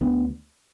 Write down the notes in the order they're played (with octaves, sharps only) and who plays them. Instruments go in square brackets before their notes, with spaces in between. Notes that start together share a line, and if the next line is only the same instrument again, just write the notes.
[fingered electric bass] D2 B3 D4